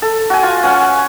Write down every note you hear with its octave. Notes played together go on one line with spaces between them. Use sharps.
A4
F#4 G#5
F4
C#4 F#5 G#5 C#6